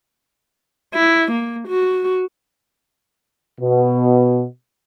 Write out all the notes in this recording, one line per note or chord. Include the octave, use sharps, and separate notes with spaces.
E4
A#3
F#4
B2